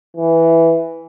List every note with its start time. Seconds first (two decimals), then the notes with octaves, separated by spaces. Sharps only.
0.17 E3